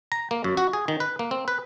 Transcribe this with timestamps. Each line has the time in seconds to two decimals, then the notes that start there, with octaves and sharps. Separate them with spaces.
0.12 A#5
0.31 A#3
0.44 F#2
0.57 F#4
0.73 G#4
0.88 D#3
1.00 B4
1.19 A#3
1.31 C4
1.48 B4